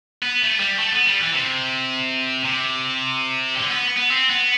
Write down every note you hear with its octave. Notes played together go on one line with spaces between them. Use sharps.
B3
A3
G3
A3
B3
G3
E3
C3
C3
D3
B3
B3
C4
B3